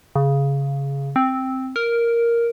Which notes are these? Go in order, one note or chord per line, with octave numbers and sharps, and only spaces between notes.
C#3
C4
A#4